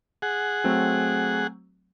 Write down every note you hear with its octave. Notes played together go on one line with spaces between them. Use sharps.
G#4 F#5
F#3 A3 C4